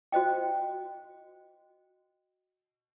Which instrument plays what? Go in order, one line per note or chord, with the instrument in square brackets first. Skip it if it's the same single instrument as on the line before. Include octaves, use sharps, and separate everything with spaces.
[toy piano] F#4 C5 D#5 G5